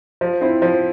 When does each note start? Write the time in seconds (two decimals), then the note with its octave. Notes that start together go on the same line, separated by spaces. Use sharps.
0.21 F3
0.41 C4 E4
0.62 F3